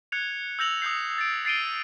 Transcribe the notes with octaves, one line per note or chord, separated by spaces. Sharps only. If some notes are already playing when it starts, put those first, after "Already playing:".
F#6 G#6 C#7 F7
E6 G6 A#6 F7 F#7
D#6 E6 G6 C7
A6 D7
A6 C7 D7 D#7 G7